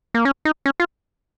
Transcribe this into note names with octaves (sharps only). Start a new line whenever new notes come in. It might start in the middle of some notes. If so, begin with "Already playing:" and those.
A#3
C#4
D#4
C#4
F4